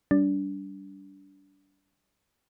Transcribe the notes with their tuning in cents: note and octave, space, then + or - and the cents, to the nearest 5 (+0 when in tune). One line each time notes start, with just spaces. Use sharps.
G3 -15 D4 -30